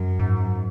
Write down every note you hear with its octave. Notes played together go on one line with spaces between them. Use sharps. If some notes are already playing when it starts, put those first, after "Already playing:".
Already playing: F#2
G#2